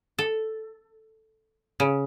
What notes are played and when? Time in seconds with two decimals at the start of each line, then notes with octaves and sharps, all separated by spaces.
0.18 A4
1.80 C#3